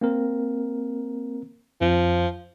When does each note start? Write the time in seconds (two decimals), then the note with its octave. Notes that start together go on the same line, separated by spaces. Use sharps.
0.01 A#3 C4 A#4
1.81 F2 F3